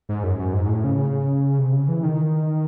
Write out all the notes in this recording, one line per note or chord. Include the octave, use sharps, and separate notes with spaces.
G#2
F#2
F#2
G#2
A2
C#3
C3
C#3
E3
D#3